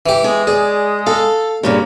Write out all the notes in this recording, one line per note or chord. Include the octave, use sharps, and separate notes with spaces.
E3 G4
G#3 G#4
G#4 D5
A4 F5
G2 A#2 C#3 A#3